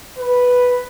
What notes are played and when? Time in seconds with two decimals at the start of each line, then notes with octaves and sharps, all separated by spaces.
0.18 B4